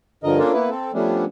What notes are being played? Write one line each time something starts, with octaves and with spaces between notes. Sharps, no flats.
G2 D3 F3 A#4 D#5
A#3 C#4 D4 F4 A4 A#4
A#3 B3 E4 B4
C4 A4
F3 G3 A3 B3 C#4 D4